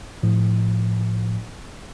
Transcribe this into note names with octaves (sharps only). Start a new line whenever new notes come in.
A2 F3